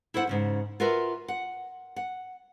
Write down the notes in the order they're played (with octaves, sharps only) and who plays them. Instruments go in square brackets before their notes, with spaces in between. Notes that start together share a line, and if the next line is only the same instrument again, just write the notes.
[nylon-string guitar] E4 A4 C5 F#5
G#2 C#3 C#4
F4 F#4 A#4 B4 E5
F#5
F#5